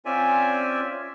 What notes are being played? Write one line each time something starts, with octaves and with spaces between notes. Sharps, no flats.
C4 C#4 F4 D5 E5 G#5